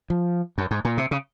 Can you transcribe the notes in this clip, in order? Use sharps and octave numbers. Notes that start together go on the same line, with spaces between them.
F3
F#2
G#2
A#2
C3
C#3